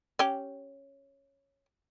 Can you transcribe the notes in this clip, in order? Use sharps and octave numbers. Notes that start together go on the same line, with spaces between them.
C#4 G4